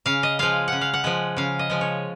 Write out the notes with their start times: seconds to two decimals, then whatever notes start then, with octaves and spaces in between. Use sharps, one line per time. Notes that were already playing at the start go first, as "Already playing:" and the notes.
0.06 C#3 F5
0.23 D#5
0.39 F3 G#3 F5
0.68 C#3 F#5
0.81 F5
0.94 F#5
1.04 F3 G#3
1.37 C#3 F5
1.59 D#5
1.70 F3 G#3
1.81 C#5